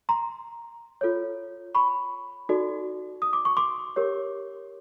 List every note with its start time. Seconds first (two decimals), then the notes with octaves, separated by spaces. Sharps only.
0.09 A#5 C6
1.01 F4 A4 C#5
1.75 B5 C#6
2.49 D#4 F#4 A4 D5
3.22 D#6
3.33 D6
3.45 C#6
3.57 C6 D6
3.96 G4 A#4 C#5